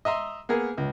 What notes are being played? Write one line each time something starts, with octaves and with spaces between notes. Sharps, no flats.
D#5 E5 A#5 C6
A#3 B3 G#4 A#4
C#2